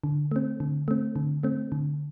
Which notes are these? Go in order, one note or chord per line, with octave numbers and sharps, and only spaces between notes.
D3
A3 C4
D3
A3 C4
D3
A3 C4
D3